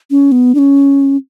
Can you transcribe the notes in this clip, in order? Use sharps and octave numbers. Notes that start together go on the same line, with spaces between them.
C#4
B3
D4
C#4